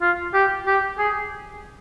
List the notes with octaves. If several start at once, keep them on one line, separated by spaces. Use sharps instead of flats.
F4
G4
G4
G#4